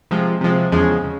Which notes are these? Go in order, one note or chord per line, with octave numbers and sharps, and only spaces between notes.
C3 F3 G#3
C3 F3 G#3
E2 C#3 F3 G#3
C#3